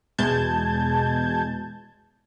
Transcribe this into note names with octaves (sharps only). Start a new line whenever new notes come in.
E2 B2 G#3 A5 G6 G#6